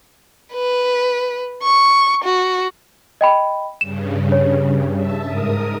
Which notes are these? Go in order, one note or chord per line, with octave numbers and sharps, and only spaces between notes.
B4
C#6
F#4
D#5 G5 B5
G2 C#3 E7
C#5
E5 A5
G#2 A#4 D#6